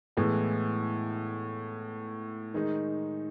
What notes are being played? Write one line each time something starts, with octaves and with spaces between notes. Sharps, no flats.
A2 E3 G#3 B3
D#3 G#3 D#4